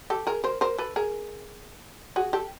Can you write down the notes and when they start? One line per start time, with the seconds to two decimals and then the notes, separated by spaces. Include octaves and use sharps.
0.10 G4 A4
0.27 G#4 A#4
0.44 A#4 C5
0.61 A#4 C5
0.78 A4 B4
0.96 G#4 A#4
2.16 F#4 G#4
2.33 G4 A4